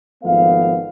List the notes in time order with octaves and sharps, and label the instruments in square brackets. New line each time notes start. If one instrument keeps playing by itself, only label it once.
[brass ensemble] G#1 F3 A3 B3 F5